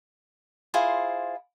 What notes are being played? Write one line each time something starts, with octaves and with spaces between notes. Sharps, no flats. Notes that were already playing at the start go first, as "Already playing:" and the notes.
E4 F4 G#4 C5